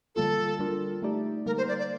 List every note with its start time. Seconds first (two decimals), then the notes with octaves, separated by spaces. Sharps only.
0.15 D3 G3 A#3 F4 A4
0.59 G3 D4 F4 A#4
1.02 A3 D#4 G4 D5
1.46 D3 G3 A#3 A#4
1.57 C5
1.68 D5
1.79 D5